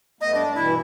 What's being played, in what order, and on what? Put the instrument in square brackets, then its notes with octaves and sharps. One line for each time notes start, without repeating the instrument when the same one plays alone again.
[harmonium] G2 A3 B3 [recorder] D#5
[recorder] D4
[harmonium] G2 B2 E3 [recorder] E4